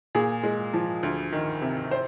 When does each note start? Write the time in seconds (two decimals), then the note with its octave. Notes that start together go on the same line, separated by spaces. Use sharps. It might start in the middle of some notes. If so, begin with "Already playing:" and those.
0.15 A#2 G#4
0.43 G#3
0.74 F3
1.03 D2
1.32 D#3
1.62 C3
1.91 C5